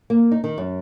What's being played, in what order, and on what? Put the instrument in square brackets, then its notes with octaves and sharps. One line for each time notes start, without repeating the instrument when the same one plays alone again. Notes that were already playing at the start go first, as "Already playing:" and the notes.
[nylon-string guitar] A#3
D#4
D#3
F#2